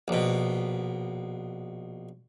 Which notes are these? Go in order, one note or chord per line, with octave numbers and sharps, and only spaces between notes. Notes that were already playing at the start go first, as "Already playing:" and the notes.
A#1 B2